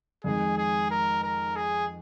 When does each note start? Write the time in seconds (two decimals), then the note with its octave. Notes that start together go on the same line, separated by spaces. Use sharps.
0.24 F2 D#3 G#3 G#4
0.57 G#4
0.91 A#4
1.24 A#4
1.56 G#4